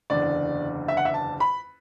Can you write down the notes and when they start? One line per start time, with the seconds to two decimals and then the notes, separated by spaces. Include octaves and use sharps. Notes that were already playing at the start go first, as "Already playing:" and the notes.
0.10 F#1 E2 D3 D5
0.88 E5
0.97 F#5
1.05 E5
1.14 A5
1.40 B5